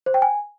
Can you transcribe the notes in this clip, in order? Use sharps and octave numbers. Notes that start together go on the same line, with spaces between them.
C5
G5
G#5